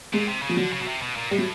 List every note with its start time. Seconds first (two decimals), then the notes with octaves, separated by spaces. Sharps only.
0.13 A#2 G#3
0.29 C3
0.43 C#3
0.49 F3
0.57 D3 F#3
0.72 C#3
0.82 B2
0.87 C3
1.02 B2
1.16 A#2
1.31 A2 G3
1.38 F#3